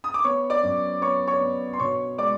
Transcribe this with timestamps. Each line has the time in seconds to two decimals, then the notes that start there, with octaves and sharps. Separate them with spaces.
0.04 D#6
0.14 D6
0.24 B3 C#5 C#6
0.50 D5 D6
0.63 F#2
1.02 B3 C#5 C#6
1.27 C#5 C#6
1.40 B3
1.73 C6
1.80 B2 C#5 C#6
2.18 G#3 D5 D6